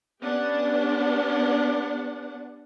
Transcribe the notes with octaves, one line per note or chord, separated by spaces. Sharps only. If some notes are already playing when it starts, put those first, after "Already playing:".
B3 C#4 D4 G4 F#5